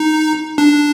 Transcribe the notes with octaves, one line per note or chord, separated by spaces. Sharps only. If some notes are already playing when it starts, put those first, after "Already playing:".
Already playing: D#4
D4